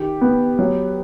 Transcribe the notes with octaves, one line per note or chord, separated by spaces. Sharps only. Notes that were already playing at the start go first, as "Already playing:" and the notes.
Already playing: D#3 G4
B3
F#3